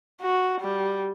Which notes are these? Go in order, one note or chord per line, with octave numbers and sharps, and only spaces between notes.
F#4
G3